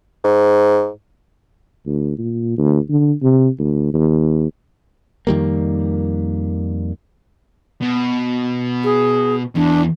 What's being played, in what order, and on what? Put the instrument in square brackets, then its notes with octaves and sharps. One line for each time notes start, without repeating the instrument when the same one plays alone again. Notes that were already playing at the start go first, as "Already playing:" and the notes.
[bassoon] G#2
[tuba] D2
A#2
D2
D3
C3
D2
D#2
[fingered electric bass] F2 D#3 G3 A#3
[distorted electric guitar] B2
[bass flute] G#4
[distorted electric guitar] E2 [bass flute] D4